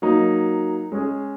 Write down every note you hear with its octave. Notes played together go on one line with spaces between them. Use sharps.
F#3 A#3 D#4
G#3 C#4 G#4